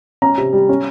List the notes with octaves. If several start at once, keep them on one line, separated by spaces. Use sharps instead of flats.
C#4 A#5
C3
G3
C#4